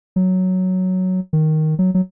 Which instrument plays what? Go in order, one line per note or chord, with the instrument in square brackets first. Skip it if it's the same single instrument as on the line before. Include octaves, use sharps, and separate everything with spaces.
[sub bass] F#3
D#3
F#3
F#3